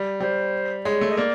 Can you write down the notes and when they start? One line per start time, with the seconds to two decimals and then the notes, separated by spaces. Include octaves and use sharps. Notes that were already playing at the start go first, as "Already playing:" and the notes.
Already playing: G3
0.20 G3 C5
0.85 G#3 C#5
1.01 A3
1.11 D#5
1.17 A#3 D5